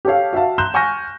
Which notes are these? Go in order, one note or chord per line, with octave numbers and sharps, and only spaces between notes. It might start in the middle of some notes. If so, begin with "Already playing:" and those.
G4 A4 C#5 F5
F#4 E5 F5 A5
A#5 C6 F#6 G6 E7 G7
G#5 C#6 F6 G6 A#6